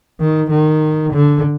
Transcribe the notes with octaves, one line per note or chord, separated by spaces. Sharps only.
D#3
D#3
D3